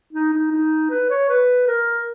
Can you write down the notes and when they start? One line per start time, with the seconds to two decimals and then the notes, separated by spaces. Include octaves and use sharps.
0.13 D#4
0.33 D#4
0.52 D#4
0.90 B4
1.10 C#5
1.29 B4
1.68 A#4